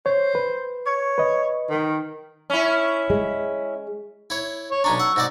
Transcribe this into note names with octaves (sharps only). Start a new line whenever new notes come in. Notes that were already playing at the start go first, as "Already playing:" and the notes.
C5 C#5
B4
C#5
B4 D#5
D#3
C#4 E4
G#3
E4 C#5
C#5
B1 C#4 D4 A#5 C#6
F#5 E6
G#2 F#4 D5